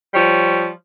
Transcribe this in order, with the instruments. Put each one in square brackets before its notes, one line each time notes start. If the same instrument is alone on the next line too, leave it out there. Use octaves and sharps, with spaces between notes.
[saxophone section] F3 G3 C#5